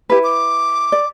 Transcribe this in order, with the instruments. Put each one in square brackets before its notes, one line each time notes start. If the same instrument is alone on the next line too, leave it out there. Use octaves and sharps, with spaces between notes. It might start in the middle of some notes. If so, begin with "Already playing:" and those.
[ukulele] E4 B4 [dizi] G4
[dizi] D6
[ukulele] D5